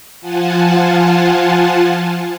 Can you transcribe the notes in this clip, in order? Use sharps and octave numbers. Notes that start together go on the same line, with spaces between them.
F3 F4 F#5 G#5 A5